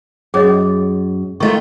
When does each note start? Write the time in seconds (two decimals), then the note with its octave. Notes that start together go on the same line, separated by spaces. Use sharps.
0.34 F#2 G#4 C#5 D#5
1.40 D#3 A3 F4 D#5 C#6